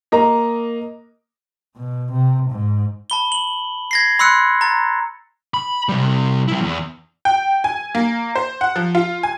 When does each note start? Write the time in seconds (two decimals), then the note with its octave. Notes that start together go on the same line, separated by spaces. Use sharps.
0.12 A#3 D#5 A#5
1.77 B2
2.12 C3
2.50 G#2
3.10 A5 B5 G7
3.32 F#7
3.91 G#6 A#6 C7
4.19 B5 C6 E6 F#6 C#7
4.61 A#5 A6
5.54 B5
5.89 C3 G3
6.48 G3 E4
6.60 E2
7.25 G5
7.64 G#5
7.95 A#3
8.36 C5
8.61 F#5
8.76 F3
8.95 F4
9.23 G#5